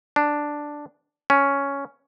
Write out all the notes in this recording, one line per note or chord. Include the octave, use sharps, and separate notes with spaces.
D4
C#4